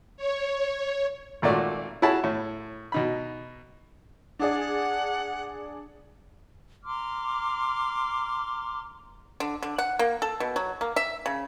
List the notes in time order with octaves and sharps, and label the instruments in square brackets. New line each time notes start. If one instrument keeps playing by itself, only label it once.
[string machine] C#5
[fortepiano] G#1 A#2 A3 F#4 D5
E4 F#4 G#4 C#5 A5 B5
A2
B2 D#4 B5
[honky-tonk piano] D4 G#4 D5 [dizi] F#5
[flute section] A#5 C6 D6 F6
[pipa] D3
D3
F#5
A#3
A4
B2
F#3
A#3
E5
C#3